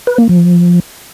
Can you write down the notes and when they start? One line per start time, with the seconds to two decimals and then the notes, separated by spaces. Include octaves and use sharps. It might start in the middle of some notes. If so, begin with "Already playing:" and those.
0.07 B4
0.18 A#3
0.29 F3